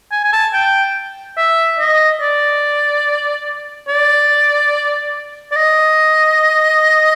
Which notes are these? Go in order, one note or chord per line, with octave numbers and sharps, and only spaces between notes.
G#5
G#5
A5
G5
E5
D#5
D5
D5
D5
D#5